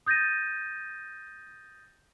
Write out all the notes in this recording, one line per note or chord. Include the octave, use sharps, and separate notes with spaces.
D#6 G6 A6 A#6 D#7